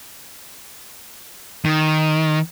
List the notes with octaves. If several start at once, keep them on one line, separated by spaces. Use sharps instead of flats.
D#3